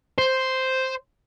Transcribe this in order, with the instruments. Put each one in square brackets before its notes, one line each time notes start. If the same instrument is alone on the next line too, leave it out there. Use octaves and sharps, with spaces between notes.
[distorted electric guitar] C5